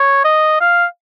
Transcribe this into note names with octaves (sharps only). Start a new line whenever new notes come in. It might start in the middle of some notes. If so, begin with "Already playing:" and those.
Already playing: C#5
D#5
F5